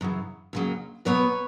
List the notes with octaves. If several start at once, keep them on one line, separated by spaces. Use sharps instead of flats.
F#2 C#3 E3
F2 C#3 F#3 A#3
B2 F#3 B3 B4 C#5